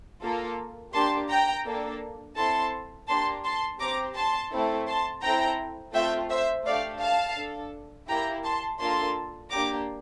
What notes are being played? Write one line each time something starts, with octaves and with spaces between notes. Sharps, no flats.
A#3 F4 A4
A#3 D4 G4 A5 C6
G5 A#5
A#3 D4 A4
C4 E4 A4 A5 C6
A#3 D4 G4 A5 C6
A5 C6
C4 G4 A#5 D6
A5 C6
A3 C4 E4 A4
A5 C6
C4 E4 A4 G5 A#5
A3 C4 F4 A4 E5 G5
C5 E5
A3 D4 G4 D5 F5
F5 A5
D4 A4
A#3 E4 G4 G5 A#5
A5 C6
A#3 D4 F4 A4 A5 C6
A#3 D4 G4 A#5 D6